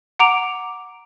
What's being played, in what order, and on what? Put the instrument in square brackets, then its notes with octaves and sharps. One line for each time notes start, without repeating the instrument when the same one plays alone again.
[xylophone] F#5 A#5 D6 D7 F7